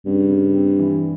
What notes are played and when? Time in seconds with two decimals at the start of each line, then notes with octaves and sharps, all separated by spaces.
0.06 G2 C#3
0.30 C#3
0.54 C4
0.79 E3